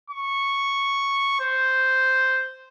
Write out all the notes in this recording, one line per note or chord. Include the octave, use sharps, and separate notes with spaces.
C#6
C5